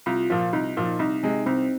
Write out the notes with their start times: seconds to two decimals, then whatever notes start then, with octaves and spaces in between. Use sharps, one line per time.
0.06 C2 F4
0.30 A#2 F3
0.53 C2 D#4
0.77 A#2 F3
0.99 C2 D#4
1.23 C3 G#3
1.46 C2 C4